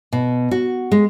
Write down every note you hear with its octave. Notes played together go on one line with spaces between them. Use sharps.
B2
F#4
G#3